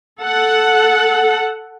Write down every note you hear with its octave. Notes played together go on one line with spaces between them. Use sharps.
A4 F#5